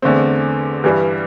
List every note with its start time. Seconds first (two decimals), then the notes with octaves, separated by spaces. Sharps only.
0.02 E2 D3 A3 C4
0.84 G2 E3 G3